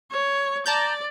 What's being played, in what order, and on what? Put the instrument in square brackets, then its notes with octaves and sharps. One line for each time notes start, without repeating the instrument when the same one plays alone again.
[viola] C#5
[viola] D5 [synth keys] A5 A#5 G6